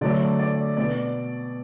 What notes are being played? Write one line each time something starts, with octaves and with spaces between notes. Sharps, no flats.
D3 F#3 A3 D5
D5
B2 B3 D5